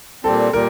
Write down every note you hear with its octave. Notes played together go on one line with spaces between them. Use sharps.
A#2 G3 C4 A4
A#2 G3 A#4